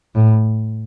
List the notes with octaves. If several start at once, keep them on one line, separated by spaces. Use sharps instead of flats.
A2